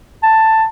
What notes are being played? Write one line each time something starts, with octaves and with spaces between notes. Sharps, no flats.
A5